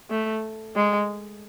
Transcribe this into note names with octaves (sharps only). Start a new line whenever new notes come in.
A3
G#3